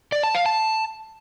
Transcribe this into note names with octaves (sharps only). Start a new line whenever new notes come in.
D5
A5
F5
A5